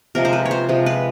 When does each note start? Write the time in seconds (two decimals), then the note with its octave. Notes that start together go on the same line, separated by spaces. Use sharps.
0.15 C3 F3 G#3 A#4
0.25 C5
0.33 B4
0.45 C#5
0.51 C5
0.69 C3 F3 G#3
0.86 B4